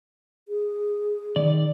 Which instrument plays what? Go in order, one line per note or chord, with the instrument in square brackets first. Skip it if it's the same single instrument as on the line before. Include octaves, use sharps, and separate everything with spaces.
[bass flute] G#4
[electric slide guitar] D#3 D5